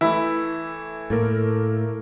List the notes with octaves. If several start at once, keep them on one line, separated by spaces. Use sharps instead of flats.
E3 A3 E4
A2 A3 A#3 A4 A#4